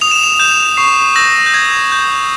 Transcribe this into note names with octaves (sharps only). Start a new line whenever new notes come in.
D#6 F7
E7
F7
G6 E7
C#6 C7
E6 G6 A#6
G6
D#6 G#6
G6